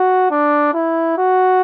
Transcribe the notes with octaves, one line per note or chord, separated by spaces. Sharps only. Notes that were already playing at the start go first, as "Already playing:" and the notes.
Already playing: F#4
D4
E4
F#4